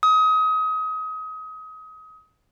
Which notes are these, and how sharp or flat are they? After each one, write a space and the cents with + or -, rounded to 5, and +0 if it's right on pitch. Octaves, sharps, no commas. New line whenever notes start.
D#6 +30